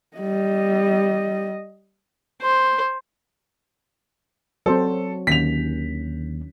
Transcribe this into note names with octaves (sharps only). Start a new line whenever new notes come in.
G3 D#5
C5
F#3 C4 F#4 A4 C5 D5
D#2 D3 D#3 C#4 B6 F7